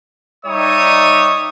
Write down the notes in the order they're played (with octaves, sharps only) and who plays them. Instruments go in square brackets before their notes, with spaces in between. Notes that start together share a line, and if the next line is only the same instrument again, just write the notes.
[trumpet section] G3 D#4 C#5 E5 C#6 D#6